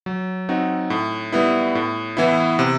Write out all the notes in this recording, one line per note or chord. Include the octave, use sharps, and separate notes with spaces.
F#3
C4 D#4 F#4
A2
G3 B3 E4
A2
E3 B3 E4
C3